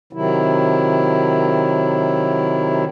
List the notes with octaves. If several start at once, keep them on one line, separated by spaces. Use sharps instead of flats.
C3 D#3 F#3 E4